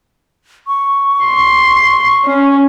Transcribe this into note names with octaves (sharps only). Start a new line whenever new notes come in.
C#6
C6
C#4